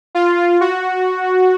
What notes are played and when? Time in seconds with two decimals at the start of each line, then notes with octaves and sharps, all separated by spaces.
0.15 F4
0.61 F#4